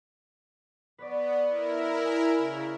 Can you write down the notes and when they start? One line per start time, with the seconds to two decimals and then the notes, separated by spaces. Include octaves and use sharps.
0.98 B3 B4 C#5 D5
1.48 E4 A#4
2.04 D#5 G#5
2.38 C#3